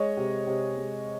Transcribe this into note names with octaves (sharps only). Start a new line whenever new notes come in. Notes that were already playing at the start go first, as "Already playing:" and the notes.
Already playing: G#3 C#5 D#5
C3
C3
G#3